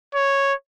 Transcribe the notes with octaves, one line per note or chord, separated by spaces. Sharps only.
C#5